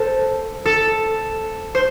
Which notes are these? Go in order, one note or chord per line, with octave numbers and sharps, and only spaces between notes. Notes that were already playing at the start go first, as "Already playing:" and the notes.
Already playing: A4 C5
A4
C5